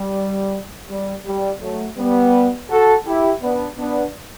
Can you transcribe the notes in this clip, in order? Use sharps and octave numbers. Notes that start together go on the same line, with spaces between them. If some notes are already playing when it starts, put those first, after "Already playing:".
Already playing: G3
G3
G3
F#3 A3
G3 B3
F#4 A4
E4 G4
B3 D4
B3 D4